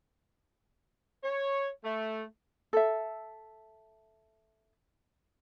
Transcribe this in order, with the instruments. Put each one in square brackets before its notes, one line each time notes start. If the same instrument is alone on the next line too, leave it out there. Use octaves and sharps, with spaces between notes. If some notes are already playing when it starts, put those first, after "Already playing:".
[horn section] C#5
A3
[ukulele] A4 E5